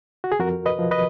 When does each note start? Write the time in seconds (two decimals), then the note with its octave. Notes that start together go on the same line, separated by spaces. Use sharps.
0.24 F#4
0.32 G#4
0.39 F2 F#4 A#4
0.66 B4 D#5
0.79 F3
0.91 B4 D#5